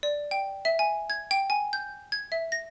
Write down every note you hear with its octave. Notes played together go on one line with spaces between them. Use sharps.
D5
G5
E5
G#5
G#6
G5
G#5
G6
G#6
E5
A#6